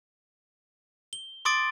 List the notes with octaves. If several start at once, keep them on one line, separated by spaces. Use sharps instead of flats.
G7
C6 D6 D#6 A6 D7